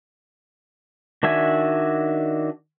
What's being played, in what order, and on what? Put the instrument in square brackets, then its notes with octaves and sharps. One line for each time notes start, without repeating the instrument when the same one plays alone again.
[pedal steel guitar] D#3 D4 F#4 E5 G#5